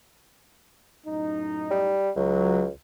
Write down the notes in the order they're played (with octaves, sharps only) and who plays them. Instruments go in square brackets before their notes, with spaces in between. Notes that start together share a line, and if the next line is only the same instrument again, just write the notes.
[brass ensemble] F#2 A2 D#4
[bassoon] G3
[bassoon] C#2 [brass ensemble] F#3